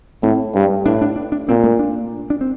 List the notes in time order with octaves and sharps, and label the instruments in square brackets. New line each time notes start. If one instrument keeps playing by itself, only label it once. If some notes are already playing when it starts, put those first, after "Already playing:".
[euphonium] A2 [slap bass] C4
[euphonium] G2
[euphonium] A2 [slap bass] D4
[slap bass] D4
D4
D4
[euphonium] A#2 [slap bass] C4
[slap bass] A3
D4
D4
C4